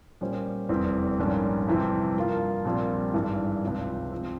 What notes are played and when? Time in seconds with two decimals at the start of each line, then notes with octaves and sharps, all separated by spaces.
0.21 A#2 G3 C#4 G4 C5
0.69 F1 E2 E3 G3 C4
1.19 A#1 G#2 G3 A#3 C#4
1.67 F2 C3 E3 G3 C4
2.16 G2 F3 A#3 F4
2.65 A#1 A#2 G3 C4 F4
3.14 G#1 G2 E3 G#3
3.63 C#2 C3 F3
4.11 F3 C4